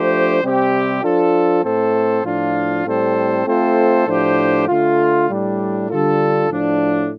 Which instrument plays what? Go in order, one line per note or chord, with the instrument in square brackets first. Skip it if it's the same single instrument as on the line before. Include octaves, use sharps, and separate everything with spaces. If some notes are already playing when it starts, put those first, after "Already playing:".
Already playing: [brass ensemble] F3 A3 D4 G4 C5
C3 G3 C4 G4
F3 D4 F4 A4
A2 A3 C4 A4 C5
A2 F3 D4 F4
A2 G3 C4 A4 C5
A3 C4 F4 A4 C5
A2 F3 D4 G4 C5
D3 A3 F4
A2 G3 D4
D3 G3 D4 F4 A4
A2 F3 D4